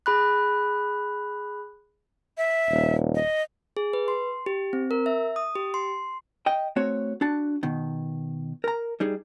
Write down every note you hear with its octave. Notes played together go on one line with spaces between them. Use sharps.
G#4 B5 F#6
E5
D#1
D#5
G#4
B4
C6
G4
C4
A#4
E5
D#6
G4
C6
D#5 G5
A3 C4 F#4 C#5
D4 F#4 A5
B2 D#3
A#4 A#5
G3 D#4 G#4